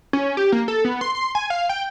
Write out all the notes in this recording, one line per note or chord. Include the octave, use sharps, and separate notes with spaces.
C#4
G4
A#3
A4
B3
C6
C6
G#5
F5
G5